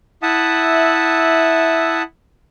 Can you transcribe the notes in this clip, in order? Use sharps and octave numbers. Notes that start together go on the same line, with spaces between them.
E4 E5 F#5 A5 D#6